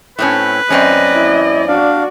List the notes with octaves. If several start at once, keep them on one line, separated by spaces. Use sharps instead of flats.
A2 C4 C#4 B4
F#2 C4 C#4 D5 D#5
E4
D4 F#4 D5 F5